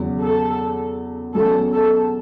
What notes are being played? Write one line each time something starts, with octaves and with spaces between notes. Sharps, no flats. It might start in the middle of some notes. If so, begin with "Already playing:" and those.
Already playing: E2 C#3 F#3
A4
E1 E2 B2 F#3 C#4 A4
A4